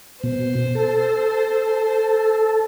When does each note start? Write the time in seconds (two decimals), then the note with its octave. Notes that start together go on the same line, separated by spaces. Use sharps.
0.23 B2 C5
0.75 A4